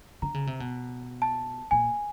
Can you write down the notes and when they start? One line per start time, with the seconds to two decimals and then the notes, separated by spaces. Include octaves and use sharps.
0.22 D3 A#5
0.34 C#3
0.47 C3
0.60 B2
1.22 A5
1.71 A#2 G#5